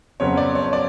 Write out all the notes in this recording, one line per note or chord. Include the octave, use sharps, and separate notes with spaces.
F2 C#3 F#3 B3 C#5
D5
C#5
C#5
D5